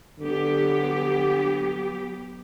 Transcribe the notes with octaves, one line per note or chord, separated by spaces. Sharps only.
D3 F#3 B3 G4